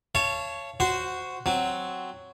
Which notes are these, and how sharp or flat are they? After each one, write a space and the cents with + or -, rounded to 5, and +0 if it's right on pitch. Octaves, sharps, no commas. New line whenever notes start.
C#5 +0 F5 -35 A5 -10
F#4 +0 C5 -10
F#3 +0 C4 +0